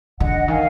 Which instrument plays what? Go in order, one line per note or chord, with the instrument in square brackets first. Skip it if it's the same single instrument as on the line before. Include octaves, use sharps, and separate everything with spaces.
[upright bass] D3 [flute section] D#5 F#5
[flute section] F#5
[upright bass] D#3 [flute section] F5 G#5